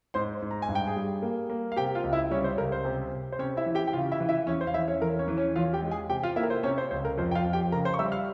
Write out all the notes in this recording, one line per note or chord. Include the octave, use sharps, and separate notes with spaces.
G#2 C5 C6
G#2
A#5
G#5
G2
G5
G#4 G#5
G3
A#3
A#3
F5
C3 G4 G5
F4 F5
C#2
E4 E5
G3 C#4 C#5
C5
C#2 A#4
C5
C3
C3
C5
C3 C#4 C#5
E4 E5
E3
G4 G5
G5
C#3 F4 F5
E4 E5
E3
E4 E5
E2 C#4 C#5
C5
F5
E3 E4 E5
C#4 C#5
E2 A#4
C#4 C#5
E3
C#4 C#5
E2 F4 F5
G4 G5
G#3
G#4 G#5
C3 G4 G5
F4 F5
A#3 E4 E5
A#4
C5
C3 C#4 C#5
C5
C#2 C5
A#4
F2 C5
G5
F4 F5
F2
G4 G5
C#3 A#4 A#5
C5 C6
C#6
G3 E5 E6
F5 F6